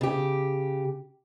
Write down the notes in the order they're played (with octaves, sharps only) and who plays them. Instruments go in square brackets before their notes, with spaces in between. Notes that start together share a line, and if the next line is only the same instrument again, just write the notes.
[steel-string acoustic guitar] C#3 G4